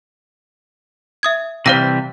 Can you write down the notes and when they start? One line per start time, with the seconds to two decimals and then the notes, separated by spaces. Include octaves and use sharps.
1.23 E5 D#6 G#6
1.66 C3 E3 G3 C5 F5 A#6